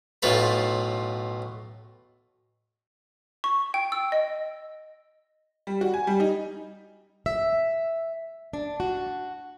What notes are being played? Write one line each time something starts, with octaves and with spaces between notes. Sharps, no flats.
B1 A2 F4 B4
C#6
G5
E6
D#5
G3
F#4
G#5
G3
D#4
E5
D4
F#4